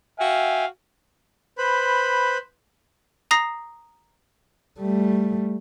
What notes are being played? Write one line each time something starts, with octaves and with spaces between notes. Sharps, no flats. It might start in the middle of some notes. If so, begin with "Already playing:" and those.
F#4 E5 F5 G5 G#5
B4 C5 B5
A#5 D#6 A#6 C7
G3 A3